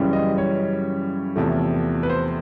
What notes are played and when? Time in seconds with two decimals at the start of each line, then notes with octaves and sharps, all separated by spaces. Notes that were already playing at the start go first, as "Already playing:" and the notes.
Already playing: F#2 C#3 E3 G3
0.13 D#5
0.38 C#5
1.36 E2 C3 F3 A3
2.03 B4
2.10 C5